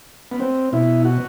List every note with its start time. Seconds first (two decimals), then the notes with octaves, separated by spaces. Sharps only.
0.31 B3
0.40 C4
0.72 B2 E4
1.05 F#4